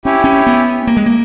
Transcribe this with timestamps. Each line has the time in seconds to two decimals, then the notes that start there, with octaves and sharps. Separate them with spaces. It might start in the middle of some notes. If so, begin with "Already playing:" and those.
0.05 C#4 E4 G4 C#5 G#5
0.24 C#4
0.47 B3
0.87 A#3
0.97 G#3
1.06 A#3